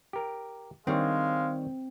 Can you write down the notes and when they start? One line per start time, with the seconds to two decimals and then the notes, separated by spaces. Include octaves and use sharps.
0.13 G4 A#4
0.87 D#3 G3 G#3 C4 C#5 F5